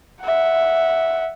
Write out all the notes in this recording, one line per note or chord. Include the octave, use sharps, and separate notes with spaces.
E5 F#5